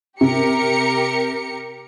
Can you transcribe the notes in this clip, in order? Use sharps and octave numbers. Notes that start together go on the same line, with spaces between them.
C3 G4 A#4 C#7